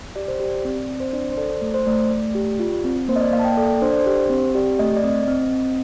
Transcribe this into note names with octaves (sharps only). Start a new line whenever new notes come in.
G4 D5
C5
G4 D5
C4
C4
C5
D4 D5
C5
A4 D5
A3
C5
A3 D5
A3
G4
F4
C4
A#3 C5
D#5
D5
A#3 F5
A5
G5
A4 D5
D4 C5
D5
C5
G4
C4
G4 D5
A3 D#5
D5
C4 D#5
C4
C4